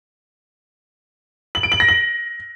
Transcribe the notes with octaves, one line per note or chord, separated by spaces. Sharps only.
F#7
D7
F#7
A#6
F#7